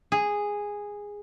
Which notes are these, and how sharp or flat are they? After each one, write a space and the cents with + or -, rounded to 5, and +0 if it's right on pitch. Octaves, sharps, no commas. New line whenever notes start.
G#4 -10